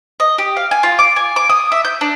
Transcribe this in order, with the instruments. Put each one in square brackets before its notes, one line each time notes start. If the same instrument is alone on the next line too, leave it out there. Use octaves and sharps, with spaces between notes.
[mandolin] D#5
G4
F5
G#5
F4
D6
G#5
D6
D#6
E5
G6
D4